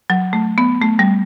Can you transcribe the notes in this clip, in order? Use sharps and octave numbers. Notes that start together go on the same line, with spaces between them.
F#3
A3
B3
A3
G3